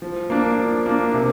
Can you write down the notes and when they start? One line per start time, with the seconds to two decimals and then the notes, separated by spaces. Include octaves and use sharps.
0.02 F3
0.30 A#3 D4
0.58 F3
0.86 A#3 D4
1.14 C3